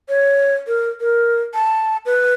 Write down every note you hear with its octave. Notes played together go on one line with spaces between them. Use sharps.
C#5
A#4
A#4
A5
B4